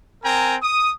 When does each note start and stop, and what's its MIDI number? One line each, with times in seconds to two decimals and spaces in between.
0.23 0.56 60
0.23 0.56 70
0.23 0.56 79
0.23 0.56 80
0.23 0.56 82
0.62 0.91 87